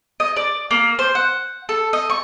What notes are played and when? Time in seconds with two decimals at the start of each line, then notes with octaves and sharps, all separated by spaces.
0.20 D#5
0.36 D5
0.71 A#3
0.99 C5
1.15 F#5
1.69 A4
1.93 D#5
2.10 C#6